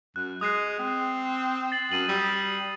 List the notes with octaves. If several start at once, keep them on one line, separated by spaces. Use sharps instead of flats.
F#2 F#6
G#3 D#6 F#6 C7
C4
A6 C7 F#7
F#2 D#7 F#7
G3 D#6 E6